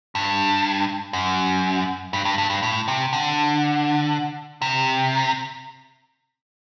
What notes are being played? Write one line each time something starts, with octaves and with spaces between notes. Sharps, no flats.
G2
F#2
G2
G2
G2
G2
A2
C3
D3
C3